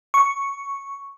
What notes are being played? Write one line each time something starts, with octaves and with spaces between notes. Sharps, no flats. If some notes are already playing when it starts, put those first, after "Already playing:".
C#6